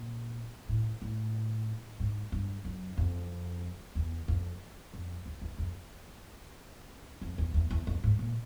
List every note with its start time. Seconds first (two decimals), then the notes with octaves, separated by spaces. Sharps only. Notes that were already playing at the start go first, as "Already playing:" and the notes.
Already playing: A#2
0.69 A2
1.02 A2
2.00 G#2
2.32 G2
2.65 F#2
2.97 F2
3.95 E2
4.28 F2
4.93 F2
5.26 E2
5.42 E2
5.58 F2
7.21 F2
7.38 E2
7.54 E2
7.71 E2
7.87 F2
8.04 G#2
8.19 A#2